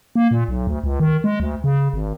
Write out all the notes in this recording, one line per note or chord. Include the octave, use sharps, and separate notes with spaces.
A#3
A#2
B1
D2
C#2
D#3
G#3
D2
C#3
G#1